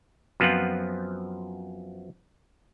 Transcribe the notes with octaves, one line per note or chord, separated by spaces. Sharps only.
F#2 F3 B3 C4 F4 F#5